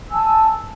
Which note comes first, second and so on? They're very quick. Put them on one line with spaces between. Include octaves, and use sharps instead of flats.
E6 G#5 A5